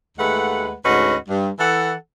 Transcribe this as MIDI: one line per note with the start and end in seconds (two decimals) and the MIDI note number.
0.18 0.73 39
0.18 0.73 56
0.18 0.73 57
0.18 0.73 71
0.18 0.73 78
0.85 1.16 38
0.85 1.16 44
0.85 1.16 61
0.85 1.16 66
0.85 1.16 71
0.85 1.16 75
1.28 1.48 43
1.59 1.93 52
1.59 1.93 69
1.59 1.93 78